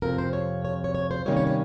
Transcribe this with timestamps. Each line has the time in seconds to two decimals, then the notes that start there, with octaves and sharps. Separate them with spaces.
0.02 F2 C3 F3 A#4
0.18 C5
0.33 C#5
0.65 C#5
0.84 C#5
0.95 C#5
1.11 C5
1.25 C3 D#3 G3 A#3 C#4 C#5
1.37 C#5
1.47 C#5